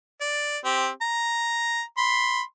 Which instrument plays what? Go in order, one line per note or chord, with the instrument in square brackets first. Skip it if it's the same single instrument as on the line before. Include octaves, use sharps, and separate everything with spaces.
[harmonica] D5
C4 G4
A#5
B5 C6